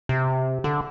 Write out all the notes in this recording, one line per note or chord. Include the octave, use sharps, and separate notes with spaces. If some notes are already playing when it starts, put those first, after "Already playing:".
C3
D3